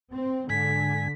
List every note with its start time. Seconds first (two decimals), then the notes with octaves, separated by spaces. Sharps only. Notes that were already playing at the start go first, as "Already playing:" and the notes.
0.12 C4
0.50 G#2 D3 G#5 B6